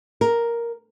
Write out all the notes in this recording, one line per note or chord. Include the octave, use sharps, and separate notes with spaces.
A#4